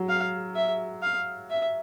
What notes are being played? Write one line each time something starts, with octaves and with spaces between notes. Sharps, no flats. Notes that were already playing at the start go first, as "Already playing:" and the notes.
Already playing: F#3
F5
E5
F5
E5